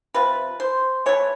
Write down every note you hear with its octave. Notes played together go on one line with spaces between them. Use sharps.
C3 F3 B4
C5
E3 A3 C#5